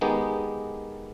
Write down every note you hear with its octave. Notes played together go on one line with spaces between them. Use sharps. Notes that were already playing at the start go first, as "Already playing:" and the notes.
D#3 G#3 B3 D#4 G4